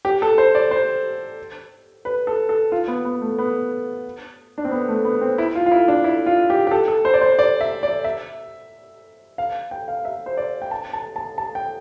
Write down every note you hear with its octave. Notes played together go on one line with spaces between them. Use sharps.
G4
A4
C5
D5
C5
B4
A4
A4
F4
B3
B3
A3
B3
D4
C4
B3
A3
B3
C4
E4
F4
F4
E4
D4
E4
F4
G4
G4
A4
A4
C5
D5
C5
D5
E5
D5
E5
F5
G5
F5
E5
C5
D5
G5
A5
A5
A5
A5
G5